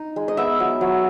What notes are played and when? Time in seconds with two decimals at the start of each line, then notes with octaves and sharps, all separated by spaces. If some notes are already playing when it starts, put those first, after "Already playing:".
Already playing: D#4
0.16 G#3
0.28 D#5
0.37 B3 E5
0.60 F#3
0.81 F#3